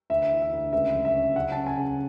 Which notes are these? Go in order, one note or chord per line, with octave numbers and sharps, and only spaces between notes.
D2 E5
E3
E5
D2
C#2 E5
F#3
E5
C#4
C#3 F#5
C#4 A5
G#5
C#3